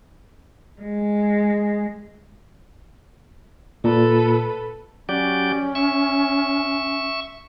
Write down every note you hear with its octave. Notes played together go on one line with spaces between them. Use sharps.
G#3
A#2 A4 B4
F#3 C#4 G4 D5
E5 C#6